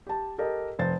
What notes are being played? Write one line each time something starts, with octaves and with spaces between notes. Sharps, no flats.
G4 A5
G4 A4 A#4 D#5
F1 C5 A6